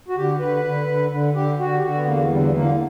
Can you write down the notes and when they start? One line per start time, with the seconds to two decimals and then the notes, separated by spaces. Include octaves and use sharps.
0.08 F#4
0.17 D3 G4
0.39 D3 B4
0.64 D3
0.88 D3
1.11 D3
1.34 D3 G4
1.58 D3 F#4
1.77 G4
1.82 D3 F#4
1.95 B3
2.05 E2 A#3
2.30 D3 G3
2.37 F#3
2.45 G3
2.54 D3 A#3